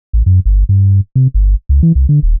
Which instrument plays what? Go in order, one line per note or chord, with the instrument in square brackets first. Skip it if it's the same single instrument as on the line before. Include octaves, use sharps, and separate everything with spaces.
[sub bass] A1
F#2
G1
G2
C3
G1
C#2
E3
C2
D3
D#1